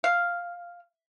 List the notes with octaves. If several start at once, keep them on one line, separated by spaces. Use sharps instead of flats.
F5